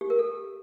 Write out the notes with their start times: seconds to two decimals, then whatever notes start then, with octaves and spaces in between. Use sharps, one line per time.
0.01 G4
0.10 A#4
0.19 A4